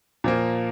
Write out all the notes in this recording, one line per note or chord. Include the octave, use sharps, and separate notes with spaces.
A#2 F3 A#3